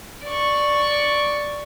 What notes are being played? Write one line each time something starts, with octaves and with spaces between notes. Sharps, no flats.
D5 C#6